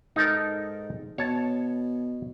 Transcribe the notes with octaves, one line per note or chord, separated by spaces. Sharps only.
G#2 D#4 A4 A#4
B2 C#5 A5